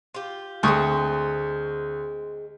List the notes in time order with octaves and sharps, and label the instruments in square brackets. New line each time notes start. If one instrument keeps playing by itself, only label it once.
[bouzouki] F4 G4
[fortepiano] D2 C#6 D#6 [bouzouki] G#3 A#3 C4